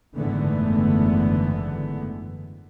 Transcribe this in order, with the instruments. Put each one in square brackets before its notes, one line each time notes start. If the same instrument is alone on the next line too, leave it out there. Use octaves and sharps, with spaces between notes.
[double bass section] F#1 G#2 D3 E3 A3 B3